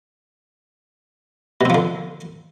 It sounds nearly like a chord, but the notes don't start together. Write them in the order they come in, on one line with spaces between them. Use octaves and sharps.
B2 C4 F3 D3